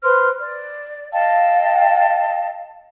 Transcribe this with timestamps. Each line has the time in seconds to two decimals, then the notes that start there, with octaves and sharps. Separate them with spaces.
0.03 B4 C5 C6 F6
0.41 D5
1.12 D#5 F5 G5 A5